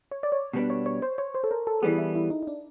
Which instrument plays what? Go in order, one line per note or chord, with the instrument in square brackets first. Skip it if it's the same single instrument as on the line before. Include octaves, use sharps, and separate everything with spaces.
[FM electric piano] C#5
D5
C#5
[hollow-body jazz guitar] B2 G3 B3 D4
[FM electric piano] C#5
C#5
C5
C#5
C5
A4
A#4
A4
[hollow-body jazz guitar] E3 G3 B3 [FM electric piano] G#4
[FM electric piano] E4
E4
D#4
D#4
D4